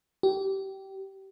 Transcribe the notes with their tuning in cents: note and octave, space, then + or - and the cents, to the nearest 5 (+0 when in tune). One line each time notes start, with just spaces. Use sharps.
G4 -20